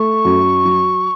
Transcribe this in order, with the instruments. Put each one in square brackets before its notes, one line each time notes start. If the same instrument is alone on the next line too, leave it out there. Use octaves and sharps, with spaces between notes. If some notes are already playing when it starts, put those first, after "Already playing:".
Already playing: [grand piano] A3 [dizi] C#6
[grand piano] F#2
F#3